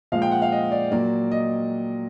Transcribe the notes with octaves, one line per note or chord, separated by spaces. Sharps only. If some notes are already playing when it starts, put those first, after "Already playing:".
A#2 F3 G#3 F5
G5
F#5
F5
D#5
D5
A#2 F#3 A#3 D5
D#5